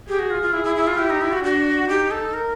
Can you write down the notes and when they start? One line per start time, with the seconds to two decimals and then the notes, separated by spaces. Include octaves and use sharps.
0.08 G4 G#4
0.19 F#4
0.31 F4
0.42 F4
0.53 E4 G#4
0.64 E4
0.76 E4
0.87 F4
0.98 E4 G4
1.10 D#4
1.21 E4
1.32 F#4
1.43 D4 F#4
1.89 D#4 G4
2.11 A4
2.33 A#4